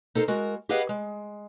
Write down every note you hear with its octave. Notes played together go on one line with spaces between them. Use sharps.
D#4 A4 A#4 C5
G#3 F#4 A#4
G4 G#4 B4 D#5 F5 F#5
G#3